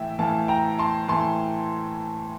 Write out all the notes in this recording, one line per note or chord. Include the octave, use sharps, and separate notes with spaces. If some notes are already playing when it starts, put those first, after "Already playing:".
Already playing: A2 E3 E5 G5
A2 E3 F5 A5
G5 A#5
A5 C6
A2 E3 A5 C6